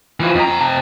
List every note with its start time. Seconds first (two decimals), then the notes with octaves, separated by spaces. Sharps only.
0.20 E3 F3
0.35 F2 A#5
0.60 C3 A5